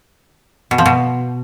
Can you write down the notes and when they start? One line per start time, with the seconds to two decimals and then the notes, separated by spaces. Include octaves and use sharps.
0.71 B2
0.78 F3
0.86 B2